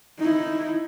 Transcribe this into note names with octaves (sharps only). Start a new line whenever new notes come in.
D#4 E4